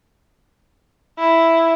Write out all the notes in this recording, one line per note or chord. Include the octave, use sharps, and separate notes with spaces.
E4